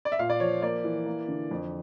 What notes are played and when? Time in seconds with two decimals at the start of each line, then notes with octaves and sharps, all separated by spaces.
0.05 D5
0.12 E5
0.19 A#2 F5
0.30 D5
0.40 F3 C#5
0.62 A#3 D5
0.84 E3
1.06 A#3
1.28 D3
1.51 F2